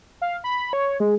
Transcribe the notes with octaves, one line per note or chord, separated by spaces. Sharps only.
F5
B5
C#5
G#3